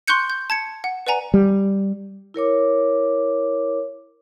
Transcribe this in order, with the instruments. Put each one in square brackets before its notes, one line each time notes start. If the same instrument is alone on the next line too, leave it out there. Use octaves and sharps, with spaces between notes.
[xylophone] C6 C#6 F#6 G6 C#7
G6
A5 G#6 C#7
F#5
B4 D5 F#5 G#5 A#5
[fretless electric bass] G3
[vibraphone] E4 A#4 C#5 D6